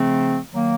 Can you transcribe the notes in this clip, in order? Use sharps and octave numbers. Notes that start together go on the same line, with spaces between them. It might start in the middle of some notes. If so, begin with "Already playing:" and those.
Already playing: C#3 F3 A3 C4
D#3 F#3 A#3